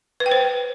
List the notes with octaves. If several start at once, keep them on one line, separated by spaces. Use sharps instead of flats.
B4
G5
C5